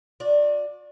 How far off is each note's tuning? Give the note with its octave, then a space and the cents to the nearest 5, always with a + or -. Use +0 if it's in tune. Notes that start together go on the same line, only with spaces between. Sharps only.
F#4 -40 D5 +0